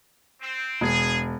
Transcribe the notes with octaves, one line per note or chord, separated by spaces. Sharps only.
C4
E1 G#4